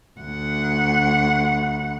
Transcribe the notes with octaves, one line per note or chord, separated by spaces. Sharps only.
D2 F#5